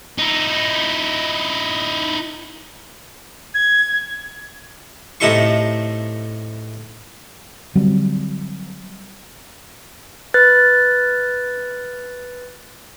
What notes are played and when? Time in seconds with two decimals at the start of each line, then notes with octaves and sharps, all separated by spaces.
0.19 D#4 E4
3.55 G#6
5.20 A2 C3 D#4 A4 C6 C#6
7.75 D3 F#3 G3 C4
10.34 B4 F#6 A6